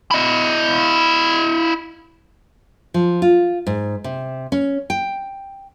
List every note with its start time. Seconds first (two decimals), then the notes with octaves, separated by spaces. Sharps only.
0.11 E4 D#5
2.94 F3
3.22 F4
3.67 G#2
4.04 C3
4.52 C#4
4.90 G5